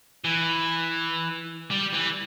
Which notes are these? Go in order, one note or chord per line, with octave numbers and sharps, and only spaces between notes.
E3
G3
E3